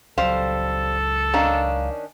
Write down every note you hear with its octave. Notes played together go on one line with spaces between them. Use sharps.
C#2 F#3 G3 A4 C5 F5
D#3 C#4 D4 F5 A#5